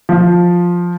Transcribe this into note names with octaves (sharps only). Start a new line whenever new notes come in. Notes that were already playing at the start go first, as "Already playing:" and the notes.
F3